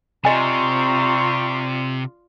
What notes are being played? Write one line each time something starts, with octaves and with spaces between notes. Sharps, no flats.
C3 C4 F4 D5 D#5 G#5 A#5 C#6